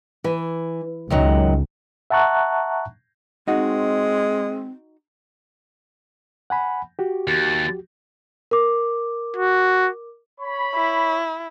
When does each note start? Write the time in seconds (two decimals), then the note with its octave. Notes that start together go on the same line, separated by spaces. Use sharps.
0.24 E3
1.10 C#2 F#2 D#3 F#3
2.11 E5 F#5 A5 A#5 C#6 F#6
3.48 G#3 C4 D#4 F#4
6.50 F#5 G#5 B5
6.99 F#4 G4
7.27 D#2 A6
8.51 A#4 D6
9.37 F#4
10.40 C#5 B5
10.75 E4